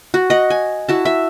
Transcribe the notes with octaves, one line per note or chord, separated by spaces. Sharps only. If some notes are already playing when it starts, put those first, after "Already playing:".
F#4
D#5 F#5
G#5
E4 F#4 A5
E5